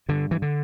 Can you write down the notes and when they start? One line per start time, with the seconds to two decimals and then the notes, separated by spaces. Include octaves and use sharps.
0.09 G2 D3
0.31 E3
0.42 D3